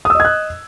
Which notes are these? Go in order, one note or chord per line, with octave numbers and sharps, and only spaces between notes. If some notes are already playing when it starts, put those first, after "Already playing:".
D#5 D#6 E6 F#6 G#6